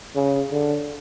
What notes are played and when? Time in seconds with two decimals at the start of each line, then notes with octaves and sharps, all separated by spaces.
0.16 C#3
0.51 D3